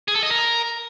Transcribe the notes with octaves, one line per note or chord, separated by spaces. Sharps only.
G#4
A4
D#5
A#4